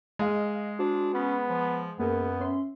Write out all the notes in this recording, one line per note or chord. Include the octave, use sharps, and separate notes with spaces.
G#3 D#5 F5
D4 F#4 C5
B3 C#4 B5
F3
F#2 A#3 B3 G#4 A#4
C#4 E5 C6